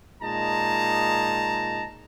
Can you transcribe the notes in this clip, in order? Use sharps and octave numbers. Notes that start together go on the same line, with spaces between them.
A#2 G#3 D#4 A5 A#5